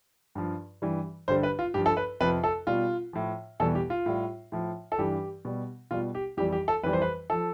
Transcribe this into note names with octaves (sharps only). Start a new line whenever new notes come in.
G2 F3
G2 E3 G3
G2 D3 G3 C5
B4
F4
G2 F3 G4
A4
B4
F2 C3 F3 B4
A4
B2 G3 F4
A2 F3
E2 B2 G3 A4
G4
F4
A2 G3
A2 F3
A4
G2 E3 G3 G4
B2 G3
B2 G3 F4
G4
F2 E3 G3 G4
G4
A4
F2 E3 G3 B4
C5
B4
F3 A4